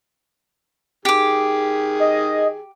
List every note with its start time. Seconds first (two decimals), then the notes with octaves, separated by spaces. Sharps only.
1.05 D#3 G4 G#4 D6
2.00 D#5